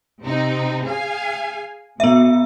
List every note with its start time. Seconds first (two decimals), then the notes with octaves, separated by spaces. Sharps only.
0.22 C3 C4 D#4
0.85 G#4 F5 G#5
2.00 B2 B3 E5